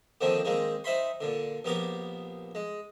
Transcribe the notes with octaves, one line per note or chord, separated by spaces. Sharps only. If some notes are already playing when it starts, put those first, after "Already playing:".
D3 D#3 F3 A#3 C4
D#3 G#3 A#3 C4
D#4 C5 E5 G5 B5 C6
A#2 D3
A#1 B3 G4 A#4 D6
G#3